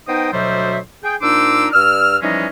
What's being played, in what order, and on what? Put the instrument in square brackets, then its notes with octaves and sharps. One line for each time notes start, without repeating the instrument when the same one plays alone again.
[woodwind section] B3 D#4 C5 D#5 G5
D2 B2 F#3 G3 C5 E5
G#4 G5
A#2 D4 D#4 C5 D6 E6
G2 D5 E6 F6
E3 F3 G3 G#3 C#4 D#4